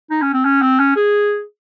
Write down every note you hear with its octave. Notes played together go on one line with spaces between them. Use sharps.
D#4
C#4
C4
C#4
C4
C#4
G#4